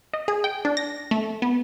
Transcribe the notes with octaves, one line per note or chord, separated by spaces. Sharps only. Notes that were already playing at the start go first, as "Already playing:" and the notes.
D#5
G#4
G5
D4
A#6
A3
B3